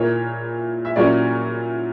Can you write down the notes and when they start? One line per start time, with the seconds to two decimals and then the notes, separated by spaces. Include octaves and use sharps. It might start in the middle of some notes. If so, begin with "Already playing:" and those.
Already playing: A#2 A#3 E4 C#5
0.85 E5
0.96 A#2 F#3 C#4 E4 D5